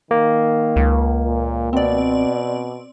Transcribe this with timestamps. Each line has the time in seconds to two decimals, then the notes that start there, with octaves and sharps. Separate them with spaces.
0.11 D#3 A#3
0.76 C#2
1.26 A#2
1.73 B2 C4 D5